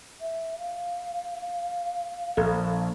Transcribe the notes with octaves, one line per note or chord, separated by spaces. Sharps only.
E5
F5
A#1 A4